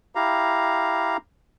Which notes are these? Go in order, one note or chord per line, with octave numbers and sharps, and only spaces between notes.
E4 G4 F5 A#5